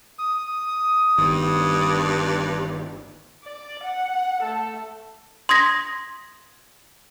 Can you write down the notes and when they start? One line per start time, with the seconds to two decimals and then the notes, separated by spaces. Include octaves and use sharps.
0.19 D#6
1.18 G1 G2 D#3
3.44 D5
3.83 F#5
4.41 A3 A4
5.49 C6 D#6 G#6 A#6 B6